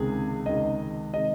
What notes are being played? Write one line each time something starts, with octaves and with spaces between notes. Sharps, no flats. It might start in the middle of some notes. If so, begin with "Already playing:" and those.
Already playing: C#2 C3 D#3 G#3 G#4
C#2 C3 D#3 G#3 D#5
C3 D#3 G#3 D#5